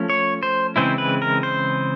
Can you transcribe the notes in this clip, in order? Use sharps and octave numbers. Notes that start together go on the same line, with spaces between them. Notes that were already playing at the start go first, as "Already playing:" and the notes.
Already playing: F3 A3 C#4
C#5
C5
C#3 E3 G#3 C4 E4 C5
B4
A#4
C5